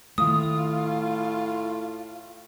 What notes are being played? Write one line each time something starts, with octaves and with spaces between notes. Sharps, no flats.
A2 D#3 A3 F4 D#6